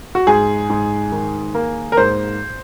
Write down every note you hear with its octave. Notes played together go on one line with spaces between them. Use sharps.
F#4
G#2 G#4
G#2
D#3
A#3
A#4
G#2 C5